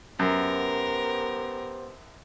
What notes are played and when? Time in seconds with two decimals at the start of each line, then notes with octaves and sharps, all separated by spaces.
0.19 F#2 B3 G4 A#4 C5